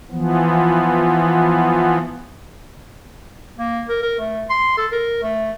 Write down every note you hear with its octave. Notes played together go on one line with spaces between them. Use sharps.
E3 F3 B3
A#3
A#4
A#4
A3
C6
A4
A#4
A3